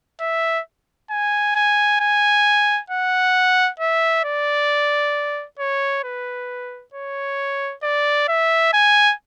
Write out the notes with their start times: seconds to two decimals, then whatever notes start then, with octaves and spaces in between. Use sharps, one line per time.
0.20 E5
1.10 G#5
1.55 G#5
2.00 G#5
2.90 F#5
3.80 E5
4.24 D5
5.59 C#5
6.04 B4
6.94 C#5
7.83 D5
8.28 E5
8.73 G#5